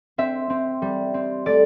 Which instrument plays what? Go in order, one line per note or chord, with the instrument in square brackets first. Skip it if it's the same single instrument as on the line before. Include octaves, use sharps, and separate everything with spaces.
[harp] C4 E5
C4
G3
C4
A3 D5